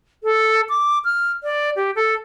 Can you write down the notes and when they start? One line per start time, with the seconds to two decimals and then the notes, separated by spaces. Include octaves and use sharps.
0.24 A4
0.69 D6
1.05 F6
1.43 D5
1.76 G4
1.96 A4